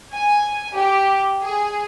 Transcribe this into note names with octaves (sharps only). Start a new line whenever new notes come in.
G#5
G4
G#4